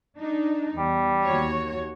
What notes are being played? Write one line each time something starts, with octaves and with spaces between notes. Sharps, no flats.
D4 D#4
E2 G3
D#2 F#4 C#5